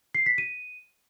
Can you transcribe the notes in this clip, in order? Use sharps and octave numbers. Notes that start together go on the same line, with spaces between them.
C7
B6
D#7